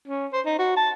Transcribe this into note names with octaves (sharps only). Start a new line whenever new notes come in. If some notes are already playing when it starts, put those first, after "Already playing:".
C#4
C5
D#4
F#4
A5